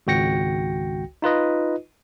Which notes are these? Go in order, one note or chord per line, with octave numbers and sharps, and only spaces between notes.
G#1 C#2 F#4 G5 A#6 C#7
D#4 F4 B4 D#5